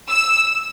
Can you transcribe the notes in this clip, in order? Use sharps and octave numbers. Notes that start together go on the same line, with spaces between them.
E6